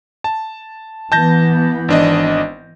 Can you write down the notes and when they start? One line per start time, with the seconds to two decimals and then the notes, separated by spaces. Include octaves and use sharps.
0.24 A5
1.12 E3 B3 A5 G6 A#6
1.89 G#1 D4 D#5